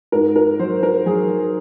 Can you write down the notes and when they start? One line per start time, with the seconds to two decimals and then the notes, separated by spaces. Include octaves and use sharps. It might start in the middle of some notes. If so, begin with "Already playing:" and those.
0.12 G#2 A#4
0.36 A#4
0.59 F#3 C5
0.83 A#4
1.06 F#3 G#4